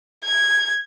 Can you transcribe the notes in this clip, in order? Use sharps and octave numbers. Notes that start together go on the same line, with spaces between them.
G#6